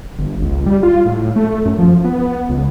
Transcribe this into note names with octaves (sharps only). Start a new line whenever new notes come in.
G1
C#2
G3
F4
A2
A3
F#2
F3
B3
C#2